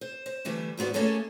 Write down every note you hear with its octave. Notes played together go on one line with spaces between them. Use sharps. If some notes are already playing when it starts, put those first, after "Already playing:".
C5
C5
D3 E3 G3 A3 E4
D#2 G#2 B3 F#4 D5
A3 A#3 C#4 G#4 A4 C#5